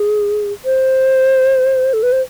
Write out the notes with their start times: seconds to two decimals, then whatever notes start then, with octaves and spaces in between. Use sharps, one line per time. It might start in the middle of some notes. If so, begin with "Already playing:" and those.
Already playing: G#4
0.65 C5
1.93 A4
2.03 B4
2.12 C5